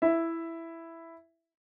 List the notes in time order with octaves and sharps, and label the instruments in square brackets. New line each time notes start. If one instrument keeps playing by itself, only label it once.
[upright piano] E4 E5